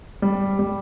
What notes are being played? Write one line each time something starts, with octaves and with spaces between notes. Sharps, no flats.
G3
G3